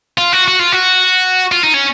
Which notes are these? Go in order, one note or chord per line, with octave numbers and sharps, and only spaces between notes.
F4
F#4
F#4
F4
F#4
F4
D#4
C#4